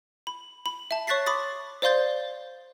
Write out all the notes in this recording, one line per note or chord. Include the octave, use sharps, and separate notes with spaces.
B5
B5
E5 A5
C#5 C#6 F#6 A6 B6 C7
B5 C6 D6 D#6 A6
C5 D5 F5 C6 G6 A6